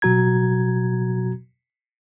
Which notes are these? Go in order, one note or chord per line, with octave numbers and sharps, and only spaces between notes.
B2 F#3 F#4 A#5 G#6